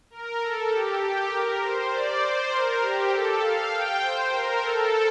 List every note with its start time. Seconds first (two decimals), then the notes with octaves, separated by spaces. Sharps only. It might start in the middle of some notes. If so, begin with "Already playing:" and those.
0.10 A#4
0.40 A4
0.70 G4
1.00 G4
1.31 A#4
1.60 C5
1.90 D5
2.20 C5
2.51 A#4
2.80 G4
3.10 A4
3.40 F5
3.70 G5
4.00 C5
4.30 A#4
4.61 A4